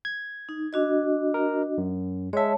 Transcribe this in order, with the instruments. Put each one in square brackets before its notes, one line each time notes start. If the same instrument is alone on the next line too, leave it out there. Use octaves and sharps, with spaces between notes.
[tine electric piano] G#6
[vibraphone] D#4
D4 F#4 D#5
[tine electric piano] A#4
F#2
[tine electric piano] G#3 E5 [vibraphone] C#5 A5